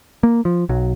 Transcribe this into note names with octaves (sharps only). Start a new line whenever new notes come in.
A#3
F3
B1 F#3